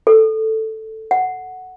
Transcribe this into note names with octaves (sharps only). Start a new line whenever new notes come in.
A4
F#5